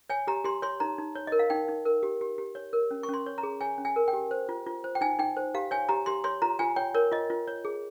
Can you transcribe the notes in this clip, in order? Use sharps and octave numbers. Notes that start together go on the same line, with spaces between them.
C#5 G#5
G4 A#5
G4 C6
C#5 C6
D#4 A#5
D#4
C#5
A#4 D#5
F5
D#4 G5
D#4
A#4
G4
G4
G4
C#5
A#4
C#4
C#6
C#4 C6
C#5
A#5
G#4
C#5 G#5
C#4
G#5
A#4
G5
G4
C5
F4
F4
C5
G5
D#4 G#5
D#4 G5
C5
G4 F5
C#5 G#5
G4 A#5
G4 C6
C#5 C6
F4 A#5
F4 G#5
C#5 G5
A#4 C#5
F4 D#5
F4
C#5
G#4